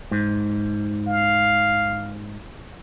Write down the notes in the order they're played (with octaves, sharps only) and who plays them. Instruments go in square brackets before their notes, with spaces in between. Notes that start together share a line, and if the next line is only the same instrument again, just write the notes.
[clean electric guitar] G#2
[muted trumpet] F5